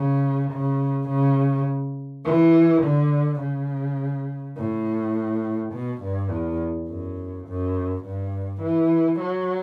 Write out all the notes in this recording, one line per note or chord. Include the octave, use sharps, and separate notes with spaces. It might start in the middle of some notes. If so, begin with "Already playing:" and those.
Already playing: C#3
C#3
C#3
E3
D3
C#3
A2
B2
G2
E2
F#2
F#2
G2
E3
F#3